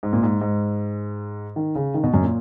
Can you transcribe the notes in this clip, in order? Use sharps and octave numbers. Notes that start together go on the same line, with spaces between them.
G#2
A#2
G#2
G#2
D#3
C#3
D#3
B2
F#2
A#2